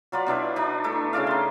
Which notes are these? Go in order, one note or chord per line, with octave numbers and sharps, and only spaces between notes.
F#3 F4 B4 D5
B2 D4 E4 B4
D4 D#4
A3 E4
C#3 E4 D5 F5
D#4 C6